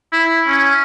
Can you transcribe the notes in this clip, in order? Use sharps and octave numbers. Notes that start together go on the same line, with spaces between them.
E4
C#4